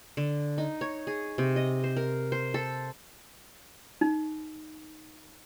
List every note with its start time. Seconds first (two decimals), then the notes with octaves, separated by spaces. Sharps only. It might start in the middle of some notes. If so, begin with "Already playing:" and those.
0.17 D3
0.58 D#4
0.81 C#5
1.07 G#4
1.38 C3
1.56 D#5
1.84 C5
1.97 A#4
2.32 C5
2.54 A4
4.01 D#4